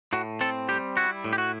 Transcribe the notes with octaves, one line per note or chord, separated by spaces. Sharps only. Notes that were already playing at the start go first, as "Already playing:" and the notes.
A2 F#4
C4 A4
G3 G4
E4 F#4
A2
G4
F#4